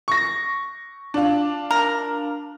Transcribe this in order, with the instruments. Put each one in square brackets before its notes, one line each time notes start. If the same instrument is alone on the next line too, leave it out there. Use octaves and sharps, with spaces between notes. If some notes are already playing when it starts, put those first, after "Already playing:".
[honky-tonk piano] C#6 A#6
D4 F4
[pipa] A#4